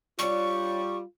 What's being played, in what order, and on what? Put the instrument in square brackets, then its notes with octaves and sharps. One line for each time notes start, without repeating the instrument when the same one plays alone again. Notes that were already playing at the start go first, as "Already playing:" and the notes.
[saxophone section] G3 [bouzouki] D4 C#5 [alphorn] F4 [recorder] C#6